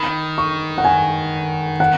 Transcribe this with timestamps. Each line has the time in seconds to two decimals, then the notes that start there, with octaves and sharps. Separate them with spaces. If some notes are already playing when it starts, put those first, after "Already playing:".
Already playing: D#3 B5
0.38 C#6
0.78 F#5
0.85 G#5
1.80 F#5